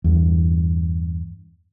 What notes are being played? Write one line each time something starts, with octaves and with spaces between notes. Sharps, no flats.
E2 G2